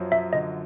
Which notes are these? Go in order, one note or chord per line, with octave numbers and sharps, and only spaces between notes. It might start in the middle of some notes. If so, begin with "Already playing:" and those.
Already playing: F#2 F3 F#3
F#2 E5
D3 D#5